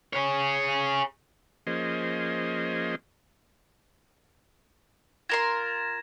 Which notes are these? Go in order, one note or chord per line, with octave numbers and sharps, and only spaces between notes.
G#4 C#5
F3 A#3 C#4 G#4 C5 D#5
F4 A#4 C6 G#6 A#6 E7